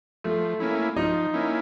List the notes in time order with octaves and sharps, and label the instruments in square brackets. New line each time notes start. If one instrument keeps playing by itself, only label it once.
[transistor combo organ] F3 [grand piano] A3
[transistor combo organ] A#3 C#4 E4
[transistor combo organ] F3 [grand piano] D#4
[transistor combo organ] A#3 C#4 E4